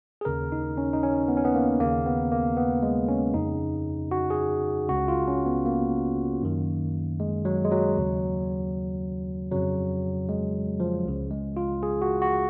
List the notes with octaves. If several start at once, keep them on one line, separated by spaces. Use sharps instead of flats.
G#4
D#2 C#3 A#4
D#4
C#4
D#4
C#4
B3
C#4
B3
A#3
D#2 C#3 A#3
B3
A#3
B3
G#3
C#4
F2 C#3 D#4
F#4
G#4
C#2 C#3 F#4
F4
C#4
B3
A#3
F#2 D#3
G#3
F#3
G#3
F#3
D#2 C#3
F2 C#3 F#3
G#3
F3
C#2 C#3
G#3
F4
G#4
F#4
F#4